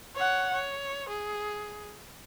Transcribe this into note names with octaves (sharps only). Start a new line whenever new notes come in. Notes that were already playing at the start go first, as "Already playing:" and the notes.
C#5 F#5
C#5
G#4